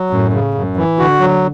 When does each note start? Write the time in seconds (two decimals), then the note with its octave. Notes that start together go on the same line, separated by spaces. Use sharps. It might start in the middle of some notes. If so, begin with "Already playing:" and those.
Already playing: F#3
0.10 F#2 A2
0.33 C#3
0.54 F#2
0.77 E3
0.99 D3 F#4
1.20 F#3